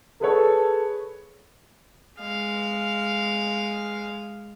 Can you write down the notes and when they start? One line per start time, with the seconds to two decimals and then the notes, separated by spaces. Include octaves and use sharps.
0.21 G#4 A4 B4 C#5
2.21 G#3 F5